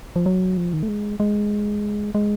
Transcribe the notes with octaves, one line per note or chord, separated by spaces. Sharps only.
F3
F#3
F3
D#3
A3
G#3
G#3
G#3